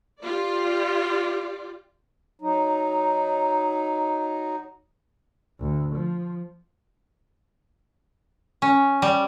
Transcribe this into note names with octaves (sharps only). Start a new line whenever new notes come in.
F4 G4 D5
F#3 D#4
D2
F3
C#4
G3